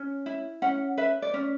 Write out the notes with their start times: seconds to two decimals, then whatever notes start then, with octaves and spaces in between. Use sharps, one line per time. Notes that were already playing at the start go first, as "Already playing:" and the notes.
Already playing: C#4
0.26 E4
0.62 C#4 F#5
0.98 B4 E5
1.22 D5
1.34 C#4